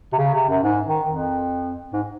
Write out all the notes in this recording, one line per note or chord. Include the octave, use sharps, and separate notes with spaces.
C3
C#3
C3
F#2
G#2
D#3
F2
G#2